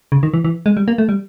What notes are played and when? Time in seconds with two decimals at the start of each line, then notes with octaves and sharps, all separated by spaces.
0.12 C#3
0.23 D#3
0.34 E3
0.45 E3
0.66 G#3
0.77 G3
0.88 A#3
0.98 A3
1.09 G3